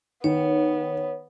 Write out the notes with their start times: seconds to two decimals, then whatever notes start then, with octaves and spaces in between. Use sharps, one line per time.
0.24 D#3 B3 C#5